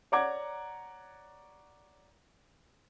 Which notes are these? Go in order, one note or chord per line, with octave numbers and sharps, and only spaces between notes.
C#5 D5 F#5 A#5 D6 G#6